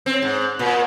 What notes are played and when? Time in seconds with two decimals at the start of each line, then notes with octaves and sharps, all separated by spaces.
0.06 C4
0.22 G#2
0.59 A#2